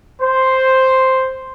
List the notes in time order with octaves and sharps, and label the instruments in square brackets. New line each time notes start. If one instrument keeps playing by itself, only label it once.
[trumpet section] C5